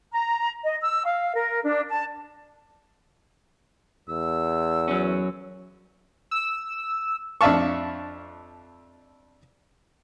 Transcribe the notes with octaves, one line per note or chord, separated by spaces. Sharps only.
A#5
D#5
E6
F5
A#4
D4
A5
E2 E6
F#3 C#4
E6
F2 D4 E5 F5 A5 C#6